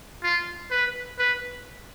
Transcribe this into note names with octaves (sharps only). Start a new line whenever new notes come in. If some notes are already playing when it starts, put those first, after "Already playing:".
F4
B4
B4